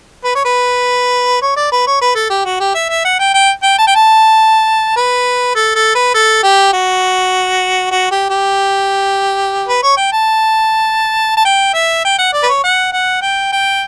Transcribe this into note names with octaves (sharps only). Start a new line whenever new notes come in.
B4
C#5
B4
C#5
D5
B4
C#5
B4
A4
G4
F#4
G4
E5
E5
F#5
G5
G5
G5
A5
G5
A5
B4
A4
A4
B4
A4
G4
F#4
F#4
G4
G4
B4
C#5
G5
A5
A5
G5
E5
G5
F#5
D5
B4
C#5
F#5
F#5
G5
G5